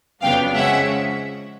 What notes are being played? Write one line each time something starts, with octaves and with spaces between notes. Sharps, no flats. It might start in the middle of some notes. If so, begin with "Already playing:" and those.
F2 C#3 F#3 B3 D4 F5 G5
C#3 F3 G#3 C#4 E5 F#5